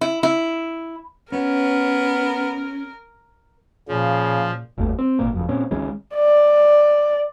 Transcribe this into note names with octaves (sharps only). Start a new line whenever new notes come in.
E4
E4
B3 C#4 A#4
A#2 C#3 F3
G1 D#2 A3
C4
G#1 A#2 A#3
F#1 F2
A#2 C4 C#4
C#2 D#3 G#3 C#4
D5